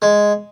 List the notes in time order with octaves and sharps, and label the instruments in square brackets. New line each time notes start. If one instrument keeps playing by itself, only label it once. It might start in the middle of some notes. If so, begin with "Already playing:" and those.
[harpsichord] G#3